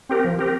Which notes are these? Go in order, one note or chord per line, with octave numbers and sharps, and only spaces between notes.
C4 G4 A#4
F3
C4 G4 A#4